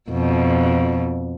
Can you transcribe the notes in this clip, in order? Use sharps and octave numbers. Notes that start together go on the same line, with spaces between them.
F2 B2